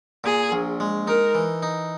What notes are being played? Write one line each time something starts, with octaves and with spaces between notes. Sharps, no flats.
A#2 G#4
A#1
G#3
D#4 A#4
E3
D#4